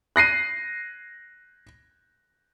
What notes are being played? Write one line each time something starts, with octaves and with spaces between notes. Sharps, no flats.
F#6 A#6 C7 D#7